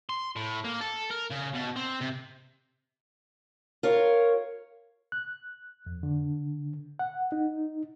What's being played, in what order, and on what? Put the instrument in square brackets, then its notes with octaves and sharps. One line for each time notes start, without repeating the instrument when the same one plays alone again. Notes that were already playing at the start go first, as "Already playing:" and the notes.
[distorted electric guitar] C6
A2
A#3
A4
A#4
C#3
B2
C4
C3
[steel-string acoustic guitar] F4 A#4 C#5
[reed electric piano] F#6
F2
D3
F#5
D#4